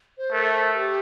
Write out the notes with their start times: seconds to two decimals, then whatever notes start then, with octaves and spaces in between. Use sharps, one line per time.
0.18 C5
0.32 A3 A#4
0.75 G4